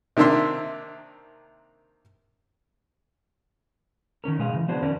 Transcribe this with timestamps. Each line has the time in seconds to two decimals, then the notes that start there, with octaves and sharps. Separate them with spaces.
0.17 C3 D#3 A#3 D4 E5 C6
4.24 D#3 F3 C#4 A#4
4.39 B2 G#3 G#4 F5
4.53 C#3 E3
4.68 F3 B3 D4 F#4 G#4 C5
4.82 F2 D#3 C#4 A#4 D5